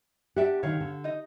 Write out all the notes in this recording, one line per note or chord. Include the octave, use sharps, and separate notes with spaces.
D4 G4 E5 F#5
D3 D#3 C#5 F5
D3
D#4 D#5